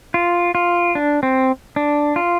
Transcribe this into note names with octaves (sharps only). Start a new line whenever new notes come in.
F4
F4
D4
C4
D4
F4